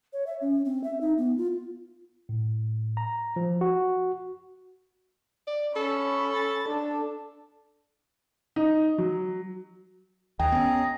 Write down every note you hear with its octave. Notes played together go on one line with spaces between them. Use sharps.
C#5
E5
C#4
C4
E5
D#4
B3
F4
A2
A#5
F3
F#4
D5
C#4 A4 B5
A6
D4 A4
D#4
F#3
D#2 G#4 D#5 G5 A#5
B3 C#4